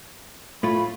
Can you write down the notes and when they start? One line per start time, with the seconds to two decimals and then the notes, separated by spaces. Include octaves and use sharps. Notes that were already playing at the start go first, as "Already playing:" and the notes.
0.63 A2 A3 F4 B5